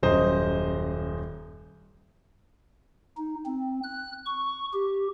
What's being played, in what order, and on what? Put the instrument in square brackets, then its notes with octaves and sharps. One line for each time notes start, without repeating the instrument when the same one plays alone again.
[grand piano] D#1 F#2 C5 D#5
[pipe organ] D#4
C4
F#6
C#6
G4